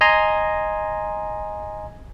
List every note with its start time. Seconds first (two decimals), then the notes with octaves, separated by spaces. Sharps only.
0.01 D#5 G#5 A#5 C6